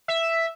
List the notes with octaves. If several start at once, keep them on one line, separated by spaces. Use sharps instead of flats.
E5